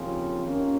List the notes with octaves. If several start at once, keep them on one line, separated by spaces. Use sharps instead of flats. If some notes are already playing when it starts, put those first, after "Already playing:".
Already playing: D#2 C#3 F3 C4
D#2 D#3 A#3 C#4 F4